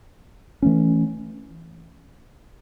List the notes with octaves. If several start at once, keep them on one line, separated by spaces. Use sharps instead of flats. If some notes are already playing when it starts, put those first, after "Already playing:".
E3 A3 C#4